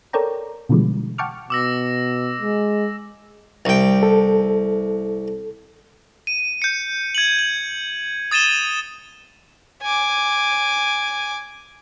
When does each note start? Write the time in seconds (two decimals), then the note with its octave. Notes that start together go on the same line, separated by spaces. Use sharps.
0.13 A4 A#4 C#5 D5 G5 A#5
0.69 B2 D3 E3 F3 G3 G#3
1.18 F#5 G5 A5 C#6 D6 F6
1.50 B2 D6 E6 A#6
2.41 G#3
3.65 C2 G5
4.03 A4
6.27 D#7
6.62 G6 C#7
7.15 G#6 D#7 F#7
7.39 F#7
8.31 D#6 A6 D#7 E7 G7
9.82 G#5 D6